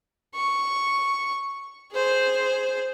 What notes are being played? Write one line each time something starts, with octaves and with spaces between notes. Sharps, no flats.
C#6
G#4 C5